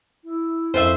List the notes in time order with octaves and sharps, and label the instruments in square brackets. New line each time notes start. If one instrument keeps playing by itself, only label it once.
[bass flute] E4
[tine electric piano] F2 C4 A4 [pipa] C#4 F4 E5 [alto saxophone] C5